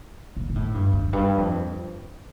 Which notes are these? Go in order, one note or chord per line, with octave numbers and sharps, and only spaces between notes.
A#2
A#2
A2
G2
F2
G2
F2